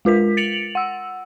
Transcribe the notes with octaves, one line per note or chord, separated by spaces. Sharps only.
G#3 F4 A#4 B6
A6 C#7 D7 F7 F#7
F#5 E6